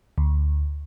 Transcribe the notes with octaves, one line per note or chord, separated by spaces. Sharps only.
D2